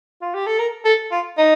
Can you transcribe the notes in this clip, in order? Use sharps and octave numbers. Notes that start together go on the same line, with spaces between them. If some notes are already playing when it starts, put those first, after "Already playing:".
F4
G4
A4
A#4
A4
F4
D#4